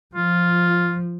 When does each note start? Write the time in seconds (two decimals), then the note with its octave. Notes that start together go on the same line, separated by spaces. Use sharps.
0.15 F3 F4